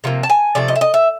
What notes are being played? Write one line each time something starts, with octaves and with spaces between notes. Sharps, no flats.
C3 F3 A#3
A5
G#5
C3 F3 A3 D5
D#5
E5
D#5
E5